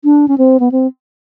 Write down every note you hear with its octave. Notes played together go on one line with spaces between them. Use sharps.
D4
C#4
C4
B3
C4